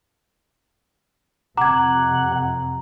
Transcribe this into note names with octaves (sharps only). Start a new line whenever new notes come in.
F2 C3 F#5 A#5 D6 G#6